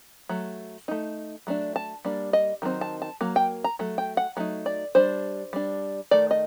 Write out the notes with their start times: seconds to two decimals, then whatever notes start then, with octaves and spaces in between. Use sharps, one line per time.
0.29 F#3 A3
0.88 A3 D#4
1.47 F#3 A3 D4
1.76 A5
2.05 G3 A#3 D4
2.33 D#5
2.62 D#3 F#3 C4 D#4
2.81 A5
3.02 A5
3.21 F#3 A#3
3.36 G5
3.64 A#5
3.79 F#3 A3
3.98 G5
4.17 F#5
4.37 F#3 A3 D#4
4.66 D5
4.95 G3 D4 C5
5.53 G3 D4
6.11 D#3 A3 D5
6.31 D#5